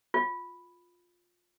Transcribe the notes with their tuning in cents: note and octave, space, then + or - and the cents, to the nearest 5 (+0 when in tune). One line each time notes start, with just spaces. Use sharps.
F4 +15